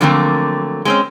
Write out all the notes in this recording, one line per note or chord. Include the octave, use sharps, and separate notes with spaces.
D3 F3 F#3 A3 A#3 C4
G#3 C4 C#4